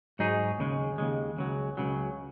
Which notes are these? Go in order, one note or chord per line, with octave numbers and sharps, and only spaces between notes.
G#2 F#3 D#4 G#4
D#2 C#3 G#3
D#2 C#3 G#3
C#2 C#3 F#3
C#2 C#3 F#3